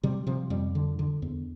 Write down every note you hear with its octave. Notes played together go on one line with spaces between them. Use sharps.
C3 G3
C3 F3
F2 G3
D3
D3
E2